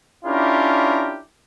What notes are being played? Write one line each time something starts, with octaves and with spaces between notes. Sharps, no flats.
C#4 D4 E4 F4 G4 A#4